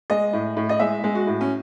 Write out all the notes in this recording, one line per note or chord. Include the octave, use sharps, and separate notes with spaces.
G#3 D#5
A2
A2
D#5
G#3 E5
G#3
F#4
A2
C#4